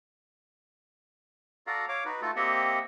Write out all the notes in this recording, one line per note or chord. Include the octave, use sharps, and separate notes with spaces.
F#4 A4 D5 F5 A#5
C#5 F5 D6
D#4 F#4 B4
A3 F4 F#4 A4
A#3 C4 G4 D#5 E5 F#5